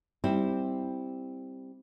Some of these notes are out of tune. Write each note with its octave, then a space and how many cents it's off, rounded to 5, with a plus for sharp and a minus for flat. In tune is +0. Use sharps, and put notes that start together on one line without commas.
G3 +0 C4 +0 E4 -10